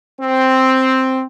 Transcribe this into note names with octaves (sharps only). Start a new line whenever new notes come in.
C4